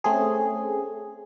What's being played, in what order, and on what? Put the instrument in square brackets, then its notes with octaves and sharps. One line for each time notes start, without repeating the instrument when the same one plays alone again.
[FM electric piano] A3 C4 C#4 G#4